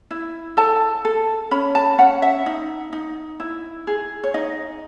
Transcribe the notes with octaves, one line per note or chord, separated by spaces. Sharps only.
E4
A4 A5
A4
C#4 B5
A5
C#4 F#5
E5
D#4
D#4
E4
G#4
C#5
D#4 D#5